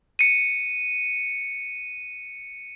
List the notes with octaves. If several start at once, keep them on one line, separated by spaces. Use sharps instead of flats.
C#7 D#7